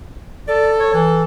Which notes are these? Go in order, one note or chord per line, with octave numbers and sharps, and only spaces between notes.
A4 D5
C#5
E3